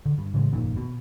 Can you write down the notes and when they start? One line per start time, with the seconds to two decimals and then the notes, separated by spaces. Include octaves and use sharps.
0.06 D3
0.18 G2
0.34 A2 C#3 E3 G#3
0.52 G1 F2 A#2 D#3
0.76 B2